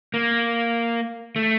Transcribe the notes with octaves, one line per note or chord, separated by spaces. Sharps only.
A#3
A3